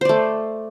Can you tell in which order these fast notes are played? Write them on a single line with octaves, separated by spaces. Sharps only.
C5 D5 A3